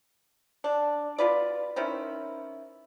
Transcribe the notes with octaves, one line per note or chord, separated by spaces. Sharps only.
D4
B2 F4 B4 D5
D#3 C4 C#4 E4